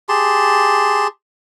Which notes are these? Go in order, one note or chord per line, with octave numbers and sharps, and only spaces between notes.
G4 G#4 A5 C6